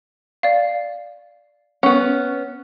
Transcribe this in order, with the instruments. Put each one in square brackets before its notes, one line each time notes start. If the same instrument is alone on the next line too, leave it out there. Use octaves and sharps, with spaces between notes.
[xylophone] D5 F5
[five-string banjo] B3 C#4 [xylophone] F#5